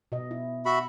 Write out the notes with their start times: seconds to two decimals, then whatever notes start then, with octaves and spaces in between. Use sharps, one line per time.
0.12 B2 D#5
0.31 E4
0.66 F#4 E5 B5